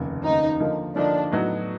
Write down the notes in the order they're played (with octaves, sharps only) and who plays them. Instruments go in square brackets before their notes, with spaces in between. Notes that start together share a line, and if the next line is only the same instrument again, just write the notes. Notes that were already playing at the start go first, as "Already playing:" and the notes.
Already playing: [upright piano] F1 D#2 C#3
[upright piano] F1 D#2 C#3 [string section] D#4
[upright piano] D3 F3 A#3 D#4
[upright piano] D3 F3 A#3 D#4 [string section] D4
[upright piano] A2 F#3 B3 D#4 F#4